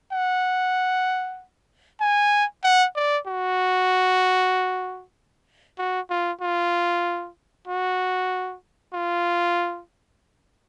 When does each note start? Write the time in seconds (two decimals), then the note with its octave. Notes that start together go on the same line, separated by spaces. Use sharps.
0.12 F#5
2.01 G#5
2.64 F#5
2.96 D5
3.27 F#4
5.79 F#4
6.10 F4
6.41 F4
7.68 F#4
8.93 F4